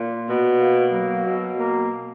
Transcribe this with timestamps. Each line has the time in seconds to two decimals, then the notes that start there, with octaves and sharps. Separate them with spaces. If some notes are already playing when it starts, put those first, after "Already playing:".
Already playing: A#2
0.26 B2
0.59 A#3
0.93 F#3
1.25 B2
1.58 A#3